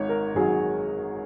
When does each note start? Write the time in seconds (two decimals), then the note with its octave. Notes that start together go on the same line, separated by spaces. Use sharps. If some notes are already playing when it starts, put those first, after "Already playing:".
Already playing: G#1 G#2 C#5
0.09 A#4
0.35 G#1 G#2 F#3 G#4